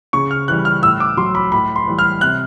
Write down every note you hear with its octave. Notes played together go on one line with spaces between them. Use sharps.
C#3 C#6
F6
E3 G3 F#6
F6
A2 E6
D6
F#3 C6
B5
A2 B5
C6
E3 G3
F6
C3 F#6